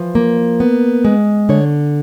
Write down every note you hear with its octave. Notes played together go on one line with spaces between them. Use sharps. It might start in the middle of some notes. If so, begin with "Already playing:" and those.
Already playing: E3 F3
A#3
B3
G#3
D3 C#5